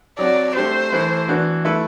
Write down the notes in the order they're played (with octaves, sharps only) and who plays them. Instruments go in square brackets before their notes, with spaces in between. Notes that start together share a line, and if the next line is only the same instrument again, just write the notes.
[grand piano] F#3 C4 F#4 [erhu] D5
[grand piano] A3 D4 G4 [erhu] C5
[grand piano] E3 A3 E4 B4
E3 B3 D4 F#4
A3 E4 B4